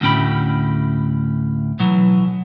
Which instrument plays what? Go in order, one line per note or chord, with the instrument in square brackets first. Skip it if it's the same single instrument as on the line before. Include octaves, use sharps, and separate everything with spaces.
[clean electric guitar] D2 A2 C#4 G5 B5
B2 E3 F#3